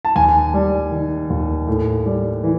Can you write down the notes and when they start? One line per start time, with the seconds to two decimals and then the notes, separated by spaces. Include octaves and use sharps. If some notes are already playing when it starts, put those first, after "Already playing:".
0.05 A5
0.16 D#2 G#5
0.54 G3
0.91 D#3
1.30 D#2
1.67 A2
2.06 G3
2.44 E3